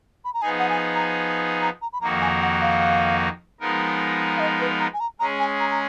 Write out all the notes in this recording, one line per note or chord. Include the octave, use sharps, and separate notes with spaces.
B5
A#5
F3 B3 D#4 G#4 G#5
F#5
G#5
A#5
A#5
A#5
B5
F2 D#3 A#3 D#4 F#4 A#5
G#5
F#5
F5
F3 G#3 B3 D#4 A#4
F5
D#5
B4
A#5
G#5
A#5
G#3 C#4 G#4 A#5
G#5
A#5
A#5